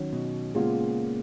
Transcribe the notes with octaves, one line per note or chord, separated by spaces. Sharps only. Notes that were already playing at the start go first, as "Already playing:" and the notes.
Already playing: D#3 F#3 C#4
B2
A#2 C#3 G#3 B3 F4